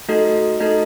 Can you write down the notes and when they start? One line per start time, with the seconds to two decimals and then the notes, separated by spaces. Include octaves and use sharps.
0.09 A3 D#4 F#4 A4 D#5
0.60 A3 D#4 F#4 A4 D#5